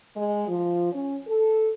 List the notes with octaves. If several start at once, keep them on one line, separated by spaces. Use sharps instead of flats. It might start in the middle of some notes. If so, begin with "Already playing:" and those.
G#3
F3
C#4
A4